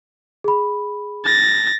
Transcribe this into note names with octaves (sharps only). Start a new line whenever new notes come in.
G#4 B5
A6 A#6